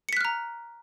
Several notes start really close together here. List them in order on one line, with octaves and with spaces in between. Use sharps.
C#7 B6 F#6 F6 A#5